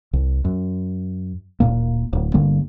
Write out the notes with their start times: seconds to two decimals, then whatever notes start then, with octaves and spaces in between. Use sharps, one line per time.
0.13 C2
0.45 F#2
1.60 D1 C2 A#2 A#3
2.13 D1
2.34 G1 D3 G3 A#3